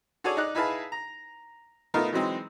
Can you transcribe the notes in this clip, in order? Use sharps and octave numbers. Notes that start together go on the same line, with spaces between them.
F#4 G#4 A4 C#5 D5 G#5
D#4 D5 F#6
D#4 E4 G#4 B4 F5 A5
A#5
A3 B3 D#4 F4 A#4
E3 F#3 G#3 C4 D#4